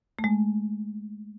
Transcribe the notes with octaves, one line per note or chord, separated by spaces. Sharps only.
A3
G#3